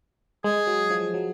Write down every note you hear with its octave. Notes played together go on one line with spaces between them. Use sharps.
G#3 G#4
F#3
F3
F#3